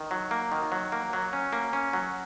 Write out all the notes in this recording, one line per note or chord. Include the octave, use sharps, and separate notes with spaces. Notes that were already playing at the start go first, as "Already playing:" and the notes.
Already playing: D#3
F#3
A#3
D#3
F#3
A#3
F#3
C#4
A#3
C#4
F#3